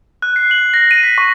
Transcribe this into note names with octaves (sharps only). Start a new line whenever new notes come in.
F#6
C7
F#7
A#6
D#7
B6
C#6